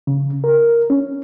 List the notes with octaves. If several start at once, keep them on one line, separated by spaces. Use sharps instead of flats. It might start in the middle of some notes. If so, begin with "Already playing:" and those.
C#3
A#4
C#4